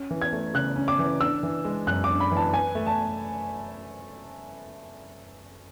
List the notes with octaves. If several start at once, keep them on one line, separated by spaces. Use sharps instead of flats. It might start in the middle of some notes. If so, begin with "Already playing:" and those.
Already playing: C#4
E3
G#6
A3
C#3 F#6
C#4
D6
E3
D4 E6
E3
G#3
F#2 F#6
D6
D4
B5
E3
A5
B4 G#5
A3
A5